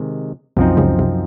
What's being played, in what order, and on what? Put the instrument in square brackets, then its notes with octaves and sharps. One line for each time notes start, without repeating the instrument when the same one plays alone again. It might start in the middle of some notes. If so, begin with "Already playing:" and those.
Already playing: [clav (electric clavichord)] C3 D#3 G#3
[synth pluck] C2 C3 [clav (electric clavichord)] F#2 F3 C4 D#4
[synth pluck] C#2 C#3
C2 C3